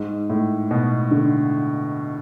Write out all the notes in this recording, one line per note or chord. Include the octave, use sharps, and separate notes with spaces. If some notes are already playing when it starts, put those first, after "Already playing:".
Already playing: G#2
A2
B2
D3